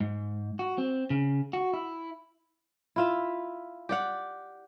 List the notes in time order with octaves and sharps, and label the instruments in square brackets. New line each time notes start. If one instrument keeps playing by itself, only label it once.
[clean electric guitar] G#2
F#4
C4
C#3
F#4
E4
[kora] E4 F4 E5
G4 D5 F#5